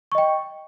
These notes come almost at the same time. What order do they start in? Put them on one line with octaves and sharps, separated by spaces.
C#6 D#5 G5